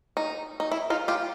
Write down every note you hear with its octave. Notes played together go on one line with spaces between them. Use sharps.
D#4
D#4
E4
D#4 F4
F4 G4